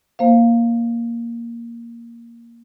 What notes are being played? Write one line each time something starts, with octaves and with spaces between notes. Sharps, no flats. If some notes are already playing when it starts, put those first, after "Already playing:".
A#3 C5 F5